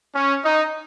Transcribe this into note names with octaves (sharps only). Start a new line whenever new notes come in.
C#4
D#4